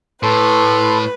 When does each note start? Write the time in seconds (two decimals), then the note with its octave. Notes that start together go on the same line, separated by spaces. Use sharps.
0.23 A2 A4 B4 C6